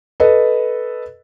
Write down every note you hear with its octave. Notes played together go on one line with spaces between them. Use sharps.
A4 B4 D#5